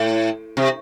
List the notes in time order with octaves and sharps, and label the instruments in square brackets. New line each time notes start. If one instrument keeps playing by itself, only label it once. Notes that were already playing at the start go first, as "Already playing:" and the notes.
Already playing: [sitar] A2
C3